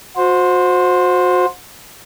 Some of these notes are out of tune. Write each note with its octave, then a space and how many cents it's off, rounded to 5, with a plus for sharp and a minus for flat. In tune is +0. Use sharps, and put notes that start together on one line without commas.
F#4 -35 C5 +0